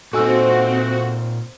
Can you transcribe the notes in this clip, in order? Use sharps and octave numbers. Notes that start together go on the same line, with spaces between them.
A#2 C4 D#4 F#4 A4 C5 G#5 E6